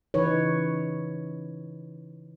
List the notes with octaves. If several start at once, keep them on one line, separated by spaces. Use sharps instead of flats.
C#3 E3 D#4 B4 C#5